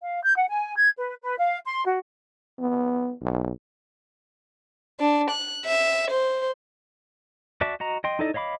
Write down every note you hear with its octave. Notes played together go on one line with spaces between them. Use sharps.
F5
G6
F#5
G#5
G#6
B4
B4
F5
C6
F#4
B3
B1
D4
F#6
E5
C5
F#4 D5 E5 A5 D6
F#4 D#5 A#5
D#5 G5 C6
D#4 E4 A4 D5 D#5
C#5 D#5 F5 B5 D6